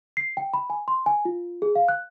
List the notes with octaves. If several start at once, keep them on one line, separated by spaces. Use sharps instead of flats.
C7
G5
B5
G#5
C6
G#5
F4
G#4
F5
F#6